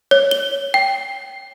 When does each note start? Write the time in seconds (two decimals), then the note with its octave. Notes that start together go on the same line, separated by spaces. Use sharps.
0.11 C#5
0.31 G7
0.74 G5